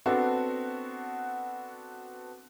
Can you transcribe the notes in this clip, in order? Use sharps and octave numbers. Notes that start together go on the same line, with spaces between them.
B3 C4 D4 F#4 A4